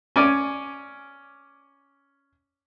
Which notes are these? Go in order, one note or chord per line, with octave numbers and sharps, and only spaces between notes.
C#4 D5 G#5